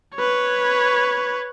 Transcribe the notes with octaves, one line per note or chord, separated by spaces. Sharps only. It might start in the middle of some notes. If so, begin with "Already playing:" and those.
B4 C#5